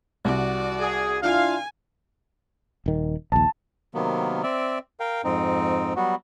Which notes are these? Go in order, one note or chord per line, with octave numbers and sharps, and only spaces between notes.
C2 F#4 D5
G#4
D4 E4 F4 F5 G#5
D#1 D#3
A#1 D#2 A5
C3 D#3 F#3 A#3 B3
C4 D5 E5
A#4 F5 G5
F2 G#2 C4 D#4
F#3 G3 B3 F#4